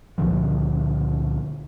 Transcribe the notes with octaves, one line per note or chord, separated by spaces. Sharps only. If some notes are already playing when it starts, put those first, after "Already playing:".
C#2 A#2 D3 F3